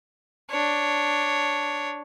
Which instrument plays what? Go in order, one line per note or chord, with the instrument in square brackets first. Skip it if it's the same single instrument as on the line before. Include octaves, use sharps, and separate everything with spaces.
[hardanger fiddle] D4 C#5